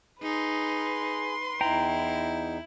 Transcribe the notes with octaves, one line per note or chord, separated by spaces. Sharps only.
D#4 G#4 B4 C6
E2 D#4 E4 G5 A#5